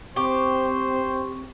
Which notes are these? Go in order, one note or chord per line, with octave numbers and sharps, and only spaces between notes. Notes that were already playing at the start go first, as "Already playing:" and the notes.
C4 G4 C5 C#6